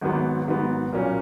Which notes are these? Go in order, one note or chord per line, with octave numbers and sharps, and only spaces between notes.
G#1 G#2 D#3 F#3 B3
G#1 G#2 D#3 F#3 B3
B1 A#2 F#3 A#3 C#4